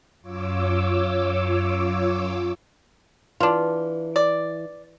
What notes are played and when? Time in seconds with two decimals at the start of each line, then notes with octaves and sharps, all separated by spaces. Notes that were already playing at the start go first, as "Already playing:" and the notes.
0.21 F#2 F4 C#5 D6 E6
3.40 E3 D4 F4
4.16 D5